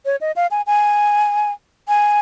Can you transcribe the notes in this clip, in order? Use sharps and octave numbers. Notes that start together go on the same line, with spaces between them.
C#5
D#5
F5
G#5
G#5
G#5